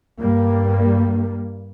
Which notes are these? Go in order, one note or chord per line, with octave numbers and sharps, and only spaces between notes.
G2 G3 A#3